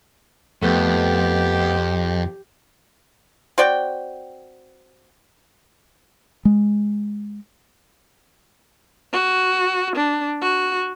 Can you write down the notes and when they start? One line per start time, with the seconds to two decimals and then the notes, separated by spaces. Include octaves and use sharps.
0.62 F2 A3 B3 G4
3.58 C4 F#4 D5 G5
6.45 G#3
9.13 F#4
9.96 D4
10.42 F#4